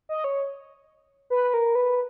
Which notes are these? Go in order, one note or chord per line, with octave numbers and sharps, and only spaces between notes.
D#5
C#5
B4
A#4
B4